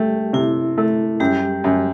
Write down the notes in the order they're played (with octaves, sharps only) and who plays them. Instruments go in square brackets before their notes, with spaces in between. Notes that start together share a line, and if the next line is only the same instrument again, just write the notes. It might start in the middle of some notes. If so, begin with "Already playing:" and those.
Already playing: [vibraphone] G3 G4 [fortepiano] A3
[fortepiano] C3 [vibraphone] E4
[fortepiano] A3
[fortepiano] F#2 [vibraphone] G3 G4
[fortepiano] F#2